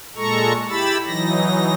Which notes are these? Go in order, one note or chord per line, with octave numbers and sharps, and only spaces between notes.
A#2 G#3 A4 A#5 C#6
E4 G4 B5 E6 A6
E3 F#3 D#4 A#6